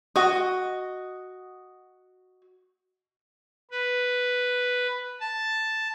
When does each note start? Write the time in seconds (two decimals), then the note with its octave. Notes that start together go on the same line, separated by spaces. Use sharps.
0.16 F#4 D#5
3.71 B4
5.20 A5